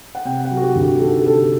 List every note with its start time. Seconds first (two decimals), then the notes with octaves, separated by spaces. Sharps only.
0.15 F#5
0.25 C3 G5
0.45 F#5
0.51 F#3
0.57 F#4
0.63 G4
0.76 D2
0.81 F#4
1.00 D#3 A4
1.21 G4
1.26 C3 A4